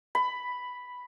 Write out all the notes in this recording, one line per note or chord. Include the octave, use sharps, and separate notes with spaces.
B5